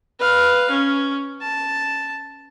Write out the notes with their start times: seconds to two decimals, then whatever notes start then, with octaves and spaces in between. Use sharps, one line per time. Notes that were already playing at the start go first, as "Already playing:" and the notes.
0.20 B4 F5
0.70 C#4
1.41 A5